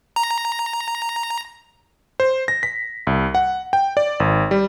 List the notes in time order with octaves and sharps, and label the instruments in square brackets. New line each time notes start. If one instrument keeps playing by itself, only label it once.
[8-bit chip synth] A#5
[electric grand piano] C5
A#6
B6
C2
F#5
G5
D5
G#1
G3